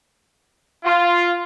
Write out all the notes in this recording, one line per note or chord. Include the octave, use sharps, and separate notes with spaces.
F4